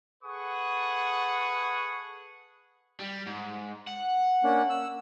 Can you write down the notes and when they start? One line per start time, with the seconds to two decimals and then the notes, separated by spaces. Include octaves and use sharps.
0.23 G#4 A4 B4 F#5 C#6 D#6
3.00 G3
3.27 G#2
3.87 F#5
4.43 A#3 C#4 D4
4.70 E6